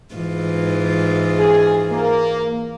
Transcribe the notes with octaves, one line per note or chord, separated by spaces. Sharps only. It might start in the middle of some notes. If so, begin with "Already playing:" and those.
G#2 E3 F4
D#2 G#4
A#3